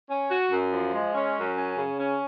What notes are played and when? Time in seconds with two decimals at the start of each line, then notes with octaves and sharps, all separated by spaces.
0.10 C#4
0.31 F#4
0.51 F#2
0.73 F3
0.94 G#3
1.15 C#4
1.36 F#2
1.58 C#4
1.78 C#3
2.00 C#4